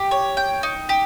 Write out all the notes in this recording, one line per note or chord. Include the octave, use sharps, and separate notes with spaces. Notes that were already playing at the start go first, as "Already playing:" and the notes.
Already playing: G4
C#5
G5
D#4
G4